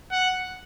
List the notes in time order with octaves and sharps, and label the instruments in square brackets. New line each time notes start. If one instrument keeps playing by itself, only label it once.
[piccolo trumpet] F#5